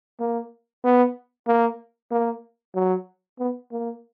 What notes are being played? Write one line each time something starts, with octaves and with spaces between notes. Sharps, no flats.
A#3
B3
A#3
A#3
F#3
B3
A#3